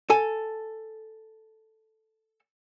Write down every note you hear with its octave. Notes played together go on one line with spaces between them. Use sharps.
A4 G#5